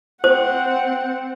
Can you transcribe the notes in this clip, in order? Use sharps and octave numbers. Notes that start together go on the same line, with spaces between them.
C4 C5 F#5